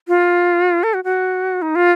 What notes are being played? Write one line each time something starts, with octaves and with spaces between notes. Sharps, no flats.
F4
A4
F#4
F#4
D#4
F4